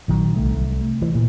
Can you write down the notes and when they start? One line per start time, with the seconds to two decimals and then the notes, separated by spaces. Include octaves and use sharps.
0.08 A#1 D#3 F#3
0.34 C2 A3
1.02 E3
1.15 A#2